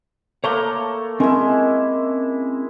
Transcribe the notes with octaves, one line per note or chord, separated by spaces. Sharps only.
A3 A#3 C#5 A#5 C6
G#3 C4 C#4 E4 A#4